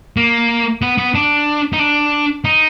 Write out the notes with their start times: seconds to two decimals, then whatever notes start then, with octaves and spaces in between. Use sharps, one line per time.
0.17 A#3
0.82 B3
0.98 B3
1.15 D4
1.73 D#4
1.79 D4
2.45 D#4